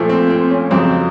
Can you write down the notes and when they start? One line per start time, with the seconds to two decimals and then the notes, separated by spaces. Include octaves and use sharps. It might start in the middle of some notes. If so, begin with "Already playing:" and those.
Already playing: A#2 F3 A3
0.09 C4
0.30 C4
0.50 C#4
0.71 F2 C#3 F#3 C4